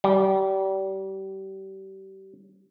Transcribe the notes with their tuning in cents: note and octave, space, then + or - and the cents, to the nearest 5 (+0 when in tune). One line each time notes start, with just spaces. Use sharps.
G3 -30